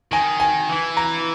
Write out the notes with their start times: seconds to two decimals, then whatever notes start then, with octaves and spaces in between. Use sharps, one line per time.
0.12 D#3 G#5
0.40 G#5
0.69 E3
0.97 A#5